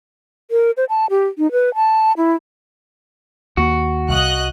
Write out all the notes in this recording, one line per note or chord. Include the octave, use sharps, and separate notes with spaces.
A#4
C5
A5
G4
D#4
B4
A5
E4
D#2 A#3 F#4
C2 D#5 F5 C#6 F#6